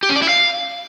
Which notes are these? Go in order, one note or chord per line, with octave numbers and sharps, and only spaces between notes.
G4
C#4
D5
E4
F5